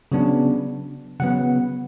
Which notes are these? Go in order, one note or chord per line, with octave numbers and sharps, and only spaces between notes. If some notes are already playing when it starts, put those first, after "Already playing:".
C#3 F#3 B3 D4
C#3 F#3 B3 F#5